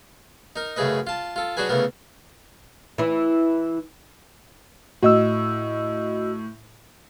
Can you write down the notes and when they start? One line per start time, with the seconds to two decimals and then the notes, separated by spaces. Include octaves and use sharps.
0.56 D#4 A#4
0.76 F#2 C#3 A3 G#4 B4 D#5
1.07 F4 A5
1.36 F4 A4
1.57 F#3 D4 F#4 G#4 B4 G#5
1.69 C#3 E3 A3 B3 A#4
2.98 E3 E4
5.03 A2 F#4 D#5 E6